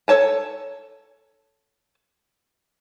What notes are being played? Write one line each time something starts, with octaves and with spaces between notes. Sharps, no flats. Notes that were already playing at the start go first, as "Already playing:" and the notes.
A4 A#4 C#5 A5 A#5